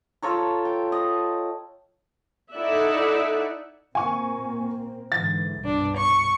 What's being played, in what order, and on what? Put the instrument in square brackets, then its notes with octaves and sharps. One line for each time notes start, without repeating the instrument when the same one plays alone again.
[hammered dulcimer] F4 A4 C#5 A#5
G5
D#5
[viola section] D#4 E4 A4 D5 E5 F#5
[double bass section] A#2 A#3 C4 [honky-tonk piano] G#5 C#6
[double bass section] G#2 D3 E3 [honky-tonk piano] A6
[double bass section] C2 G2 B2 [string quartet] D4
[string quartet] C#6